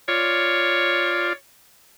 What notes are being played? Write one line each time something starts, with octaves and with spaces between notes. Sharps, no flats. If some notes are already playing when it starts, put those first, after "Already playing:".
F4 C#5 D5